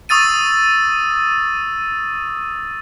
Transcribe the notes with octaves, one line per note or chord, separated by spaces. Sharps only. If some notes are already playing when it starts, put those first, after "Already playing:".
C#6 D#6 E6 A6 D#7